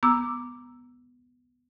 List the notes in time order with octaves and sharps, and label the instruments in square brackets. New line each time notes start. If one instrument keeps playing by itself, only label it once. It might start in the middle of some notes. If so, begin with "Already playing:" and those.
[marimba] B3 A#5 D6 E6